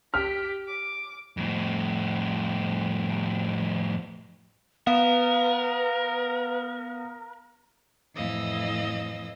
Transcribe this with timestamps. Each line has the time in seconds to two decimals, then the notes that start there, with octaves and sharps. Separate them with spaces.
0.14 G4 F6 B6
0.67 D6
1.37 F2 A2
4.87 B3 A#4 B4 F5
8.14 F2 A2 E3 D#5 F5 E6